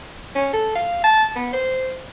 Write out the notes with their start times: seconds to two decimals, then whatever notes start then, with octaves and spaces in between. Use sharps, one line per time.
0.35 C#4
0.53 A4
0.76 F5
1.04 A5
1.36 B3
1.53 C5